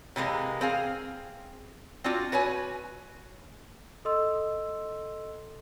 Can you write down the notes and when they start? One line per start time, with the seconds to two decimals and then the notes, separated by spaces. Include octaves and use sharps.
0.16 C3 E3 G#3 A#3
0.61 C4 G#4 F5
2.04 C4 D4 F4 F#4
2.32 F#4 B4 C#5 G#5
4.05 A4 D#5 C6 E6